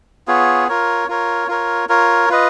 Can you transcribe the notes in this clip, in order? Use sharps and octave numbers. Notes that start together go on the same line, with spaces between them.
B3 F4 G#4 C#5
F4 A#4 C#5
F4 A#4 C#5
F4 A#4 C#5
F4 A#4 C#5
F4 B4 D#5